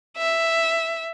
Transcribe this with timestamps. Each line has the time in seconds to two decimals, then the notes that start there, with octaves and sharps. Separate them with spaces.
0.18 E5